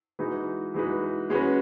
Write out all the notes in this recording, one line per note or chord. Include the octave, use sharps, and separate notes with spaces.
E3 G#3 D#4 F#4 B4
E3 G#3 D#4 F#4 B4
G#3 C#4 F#4 B4